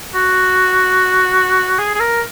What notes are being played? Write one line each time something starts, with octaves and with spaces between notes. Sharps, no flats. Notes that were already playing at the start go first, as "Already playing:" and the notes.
F#4
G#4
G#4
A#4